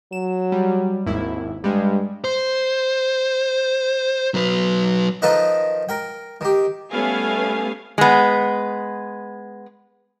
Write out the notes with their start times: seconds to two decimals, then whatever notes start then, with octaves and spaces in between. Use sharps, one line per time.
0.12 F#3 E7
0.52 G3
1.06 G#1 D#2 E4
1.64 G2 G3 G#3
2.24 C5
4.34 F#3 B4
5.22 D#3 F3 D#4 A4 B4 D#5
5.89 A#4 G5
6.41 D#3 G4
6.92 G3 A3 B3 C#4 F5 G#5
7.98 G#3 B3